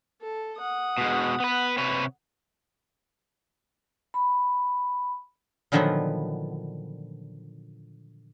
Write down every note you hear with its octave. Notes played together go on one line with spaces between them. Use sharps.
A4
F#5 D#6
B2 G#3
B3 B4
C3 B4 C#5
B5
A#2 D3 D#3 F3 F#3 B3